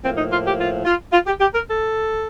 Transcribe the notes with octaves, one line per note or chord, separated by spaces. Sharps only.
A2 F3 A#3 C4
D#4
F4
G4
F4
F4
F4
G4
G4
A#4
A4